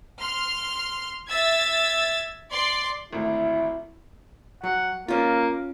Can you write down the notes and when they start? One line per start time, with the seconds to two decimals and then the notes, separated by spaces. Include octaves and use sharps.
0.19 C6 F6
1.28 E5 E6 G#6 A6
2.51 D5 C6
3.13 G#1 D2 E4
4.63 F#3 F#5
5.08 A#3 C#4 F4